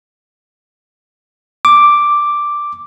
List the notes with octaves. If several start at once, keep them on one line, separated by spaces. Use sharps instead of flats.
D6